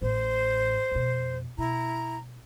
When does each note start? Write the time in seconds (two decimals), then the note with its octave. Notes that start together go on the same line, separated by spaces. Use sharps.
0.02 A1 A2 C5
0.91 F2 B2
1.58 B2 E4 A#5